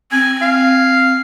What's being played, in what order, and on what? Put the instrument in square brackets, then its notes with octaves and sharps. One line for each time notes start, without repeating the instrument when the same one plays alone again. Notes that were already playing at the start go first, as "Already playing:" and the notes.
[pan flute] C4 [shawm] G#5
[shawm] F5